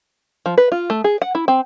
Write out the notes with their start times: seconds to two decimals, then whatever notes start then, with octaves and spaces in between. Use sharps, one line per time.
0.46 F3
0.58 B4
0.72 F4
0.90 A3
1.04 G#4
1.22 F#5
1.35 E4
1.48 C4